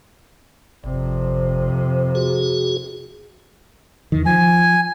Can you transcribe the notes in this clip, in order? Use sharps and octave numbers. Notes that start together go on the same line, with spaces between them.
G1 F2 C3
F#4 G#4
E2 D#3
F3 G#5